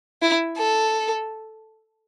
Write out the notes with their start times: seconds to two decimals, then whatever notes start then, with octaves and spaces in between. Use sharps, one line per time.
0.22 E4
0.57 A4